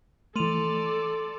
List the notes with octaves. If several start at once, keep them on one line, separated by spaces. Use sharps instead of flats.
E3 A3 A4 D5 C6 D#7 F7